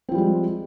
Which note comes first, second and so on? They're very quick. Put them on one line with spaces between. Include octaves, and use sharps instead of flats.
C4 F3 G3 G#3